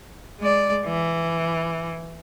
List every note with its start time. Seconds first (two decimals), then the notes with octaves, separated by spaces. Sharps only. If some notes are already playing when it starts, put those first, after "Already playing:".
0.40 G#3 D5
0.86 E3